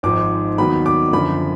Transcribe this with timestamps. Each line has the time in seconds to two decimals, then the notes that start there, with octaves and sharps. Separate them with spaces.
0.03 G#1 G#2 F3 D6
0.58 D#2 D#3 F#3 B3 B5
0.86 D6
1.13 F#2 D3 F3 B5